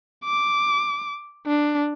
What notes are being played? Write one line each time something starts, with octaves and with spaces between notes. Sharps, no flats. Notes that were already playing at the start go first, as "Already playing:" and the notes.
D6
D4